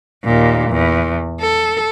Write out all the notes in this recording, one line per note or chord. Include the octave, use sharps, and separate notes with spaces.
D#2 A#2
E2
A4